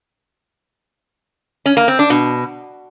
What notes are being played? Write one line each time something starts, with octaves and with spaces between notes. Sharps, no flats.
C#4
A#3
C4
D4
B2